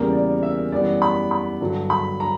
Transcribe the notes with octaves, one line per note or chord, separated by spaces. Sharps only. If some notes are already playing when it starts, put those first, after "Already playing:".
Already playing: E2 C#3 G3 A#3 A#4
D5
E5
F#2 E3 G3 B3 D5
B5
B5
G2 D3 F#3
B5
A#5